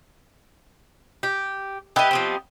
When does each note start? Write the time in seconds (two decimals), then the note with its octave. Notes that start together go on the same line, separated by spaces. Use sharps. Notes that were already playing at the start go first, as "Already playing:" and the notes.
1.23 G4
1.96 B3 E4 G4 D#5
2.11 F3 B3 C4